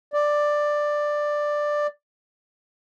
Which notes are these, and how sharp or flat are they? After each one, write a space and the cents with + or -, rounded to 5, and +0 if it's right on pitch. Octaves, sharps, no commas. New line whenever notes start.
D5 +10